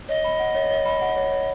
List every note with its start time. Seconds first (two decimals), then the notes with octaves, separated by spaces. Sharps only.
0.09 C#5 D#5
0.24 B5
0.40 F#5
0.55 C#5
0.70 C#5
0.85 B5
1.01 F#5
1.17 C#5
1.32 C#5